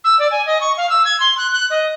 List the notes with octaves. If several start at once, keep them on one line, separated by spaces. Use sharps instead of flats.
E6
D5
G#5
D#5
C#6
F5
E6
G#6
C6
F#6
F#6
D#5